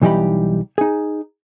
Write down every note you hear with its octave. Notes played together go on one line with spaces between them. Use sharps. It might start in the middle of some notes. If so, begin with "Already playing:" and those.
B1 E3 G3 D#4 G4 B5
D#4 G#4